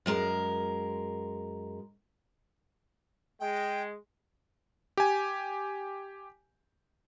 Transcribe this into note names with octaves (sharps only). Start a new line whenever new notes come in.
F#2 G#3 A#4
G#3 G5
G4 G#5